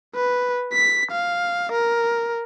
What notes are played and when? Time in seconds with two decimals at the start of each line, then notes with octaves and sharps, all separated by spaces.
0.15 B4
0.73 B6
1.12 F5
1.72 A#4